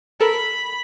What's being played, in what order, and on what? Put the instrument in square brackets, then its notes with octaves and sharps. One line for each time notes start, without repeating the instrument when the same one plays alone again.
[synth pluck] A4 A#4 [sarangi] B5